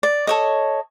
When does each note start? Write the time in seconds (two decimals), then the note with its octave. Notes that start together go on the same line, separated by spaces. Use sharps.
0.03 D5
0.27 A4 C#5 D#5